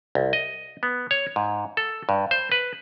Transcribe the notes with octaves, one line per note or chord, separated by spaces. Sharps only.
C2
D#5
B3
C#5
G#2
A4
G2
C5
B4